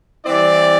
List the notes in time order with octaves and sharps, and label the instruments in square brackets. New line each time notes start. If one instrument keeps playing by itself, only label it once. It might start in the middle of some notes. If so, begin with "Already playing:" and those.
[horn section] E3 G3 C4 E4 D5